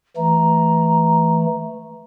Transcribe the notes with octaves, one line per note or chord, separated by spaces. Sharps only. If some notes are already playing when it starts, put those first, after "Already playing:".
E3 A3 A#5